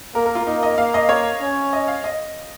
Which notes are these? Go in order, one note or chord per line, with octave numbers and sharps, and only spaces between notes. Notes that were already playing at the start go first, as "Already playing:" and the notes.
A#3 A#4
A#4
F4
A#3 D#4
D#5
A#3 F5
D#5
C#5
C#4
D#5
F5
D#5